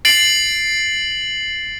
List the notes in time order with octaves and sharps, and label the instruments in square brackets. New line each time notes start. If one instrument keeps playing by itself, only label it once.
[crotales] A6 C7 D7 F#7